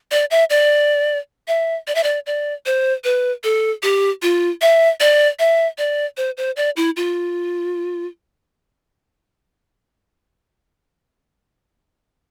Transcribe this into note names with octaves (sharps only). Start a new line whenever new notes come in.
D5
E5
D5
E5
D5
E5
D5
D5
C5
B4
A4
G4
F4
E5
D5
E5
D5
C5
C5
D5
E4
F4